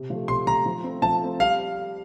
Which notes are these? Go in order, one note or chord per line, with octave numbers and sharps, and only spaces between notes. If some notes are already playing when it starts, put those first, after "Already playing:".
Already playing: C3
F3 A3
C3 C6
F3 A3 A#5
F3
A3 C4
F3 A5
A3 C4
G3 F5